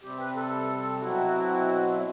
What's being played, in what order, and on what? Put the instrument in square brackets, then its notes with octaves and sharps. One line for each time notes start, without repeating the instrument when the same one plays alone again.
[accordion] C3 G3 C4 G4
B4
A4
B2 F#3 C4 E4 F#4